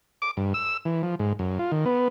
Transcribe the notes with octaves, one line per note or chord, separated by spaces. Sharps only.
D6
G2
E6
E3
F3
G#2
F#2
F4
D#3
B3